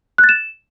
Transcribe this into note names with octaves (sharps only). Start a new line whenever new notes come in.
F#6
A6
E7